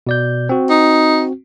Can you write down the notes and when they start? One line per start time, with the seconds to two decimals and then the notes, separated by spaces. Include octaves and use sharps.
0.07 B2 D5 G6
0.49 C4 F#4
0.70 D#4